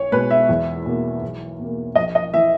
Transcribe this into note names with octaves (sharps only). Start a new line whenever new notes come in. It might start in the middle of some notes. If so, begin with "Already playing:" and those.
Already playing: B1 C#5
B2 G#3 B3 B4
E5
E2
B2 A#3
B1
B2 A#3
A#1 D#5
D#5
E3 E5